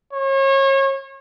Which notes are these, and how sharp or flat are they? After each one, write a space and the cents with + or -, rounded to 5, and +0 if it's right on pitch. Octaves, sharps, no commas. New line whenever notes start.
C#5 -35